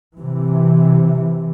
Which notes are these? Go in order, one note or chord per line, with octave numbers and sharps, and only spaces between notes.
C3 E3